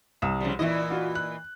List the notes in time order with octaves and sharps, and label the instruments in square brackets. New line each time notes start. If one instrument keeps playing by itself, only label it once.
[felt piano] C2 D#6 E7
[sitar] C#3 F3 G3
[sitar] A#2 E3 D#5 [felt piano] E4 E5
[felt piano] F4 F#4
F#6